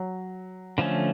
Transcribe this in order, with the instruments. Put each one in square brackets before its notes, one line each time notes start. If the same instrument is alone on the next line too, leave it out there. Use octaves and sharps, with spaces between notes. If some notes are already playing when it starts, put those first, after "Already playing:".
Already playing: [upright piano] F#3
[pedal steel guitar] D3 F3 A3 C#4